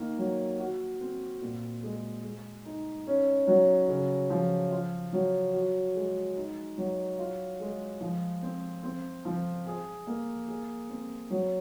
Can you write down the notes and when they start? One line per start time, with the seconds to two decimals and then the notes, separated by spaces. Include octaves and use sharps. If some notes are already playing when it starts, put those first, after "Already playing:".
Already playing: D#3 A#3
0.18 F#3
0.59 F#4
1.00 C4
1.41 A#2
1.83 G#3
2.24 G#3
2.65 D#4
3.07 C#4
3.47 F#3
3.88 C#3
4.30 F3
4.71 F4
5.13 F#3
5.53 F#4
5.95 G#3
6.36 D#4
6.78 F#3
7.19 F4
7.60 G#3
8.01 F3
8.42 C4
8.83 C4
9.25 F3
9.66 G#4
10.07 A#3
10.48 G#4
10.90 C4
11.30 F#3